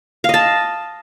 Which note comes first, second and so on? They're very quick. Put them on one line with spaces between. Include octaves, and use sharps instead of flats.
F5 D#5 A5